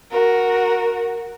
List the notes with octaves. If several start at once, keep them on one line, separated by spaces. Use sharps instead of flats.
F#4 A#4